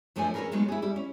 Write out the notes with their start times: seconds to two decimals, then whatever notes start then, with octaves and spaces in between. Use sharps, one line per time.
0.16 F#2 F3 A3 D4 C5 G#5
0.34 C#4 E4 G4 G#4 A#4 B4
0.52 F#3 G#3 A3 B3 D#4
0.68 E4 G#4
0.82 G3 E4
0.96 C#4